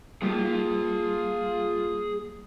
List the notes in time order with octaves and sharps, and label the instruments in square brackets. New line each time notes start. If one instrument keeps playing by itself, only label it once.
[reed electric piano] G3 A#3 [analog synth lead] F4 [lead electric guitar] G#4 G5